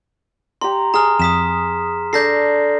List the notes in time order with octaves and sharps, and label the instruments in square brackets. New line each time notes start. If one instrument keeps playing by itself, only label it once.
[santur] G4 A#5 [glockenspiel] C6
[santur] G#4 [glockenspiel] A#5 F6
[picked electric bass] F2 [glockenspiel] D#6 B6 E7
[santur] D4 A4 [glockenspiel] G6 A#6 C7